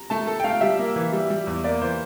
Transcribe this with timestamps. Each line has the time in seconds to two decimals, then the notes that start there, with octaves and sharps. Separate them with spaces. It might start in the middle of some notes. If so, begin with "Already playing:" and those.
Already playing: A#5
0.10 A3 A5
0.27 A4
0.40 G5
0.44 A3 F5
0.61 G3 E5
0.79 A#3
0.96 E3
1.12 G3
1.30 G3
1.47 E2
1.64 A#3 D5
1.81 E3 C5